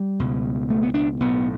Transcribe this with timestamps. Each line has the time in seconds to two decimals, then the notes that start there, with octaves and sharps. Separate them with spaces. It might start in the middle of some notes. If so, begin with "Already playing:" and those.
Already playing: G3
0.19 C#2 B2
0.70 A3
0.83 B3
0.94 D4
1.20 B1 A2 B3